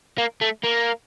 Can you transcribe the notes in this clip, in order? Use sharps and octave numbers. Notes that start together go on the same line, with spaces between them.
A#3
A3
A#3